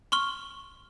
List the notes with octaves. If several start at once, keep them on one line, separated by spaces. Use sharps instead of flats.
C6 C#6 F6 G7